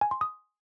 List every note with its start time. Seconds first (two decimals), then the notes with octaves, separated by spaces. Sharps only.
0.01 G#5
0.11 C6
0.21 D#6